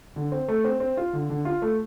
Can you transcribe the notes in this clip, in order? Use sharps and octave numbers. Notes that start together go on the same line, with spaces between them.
D3
C4
A3
C4
C4
F4
D3
D3
F4
A3